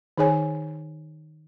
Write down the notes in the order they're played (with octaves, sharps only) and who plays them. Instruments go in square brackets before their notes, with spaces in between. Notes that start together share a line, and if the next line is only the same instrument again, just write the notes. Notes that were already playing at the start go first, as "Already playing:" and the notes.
[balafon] D#3 D#4 G#4 C#5 G#5